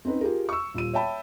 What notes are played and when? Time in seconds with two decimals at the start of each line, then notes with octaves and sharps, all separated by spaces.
0.05 C4 C#4 D#4 B4
0.21 F4 G4 G#4 A#4
0.49 C#6 E6
0.74 D#1 F4 D#7
0.93 C#5 E5 G5 A5 B5